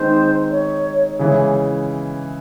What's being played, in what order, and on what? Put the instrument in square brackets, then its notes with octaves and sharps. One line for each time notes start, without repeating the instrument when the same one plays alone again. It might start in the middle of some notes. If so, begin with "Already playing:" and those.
Already playing: [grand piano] D#3 G#3 C4 D#4 [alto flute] C5
[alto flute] C#5
[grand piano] C#3 E3 G#3 [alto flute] C#5